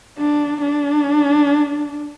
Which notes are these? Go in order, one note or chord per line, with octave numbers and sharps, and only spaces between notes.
D4
D4